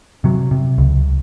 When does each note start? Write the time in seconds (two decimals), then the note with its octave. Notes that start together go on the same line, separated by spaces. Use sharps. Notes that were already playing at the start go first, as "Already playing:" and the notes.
0.24 C3 F#3
0.51 C3
0.78 C#2